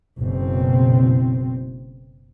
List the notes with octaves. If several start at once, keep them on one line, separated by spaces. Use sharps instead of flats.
F#1 B2 C4